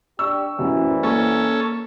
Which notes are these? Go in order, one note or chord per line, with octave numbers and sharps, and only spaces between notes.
D4 G4 C#6 E6
C2 F#2 A2 E3
A#3 C#4 A4